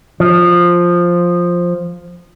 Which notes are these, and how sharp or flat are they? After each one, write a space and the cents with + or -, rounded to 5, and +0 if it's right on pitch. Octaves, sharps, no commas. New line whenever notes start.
F3 +5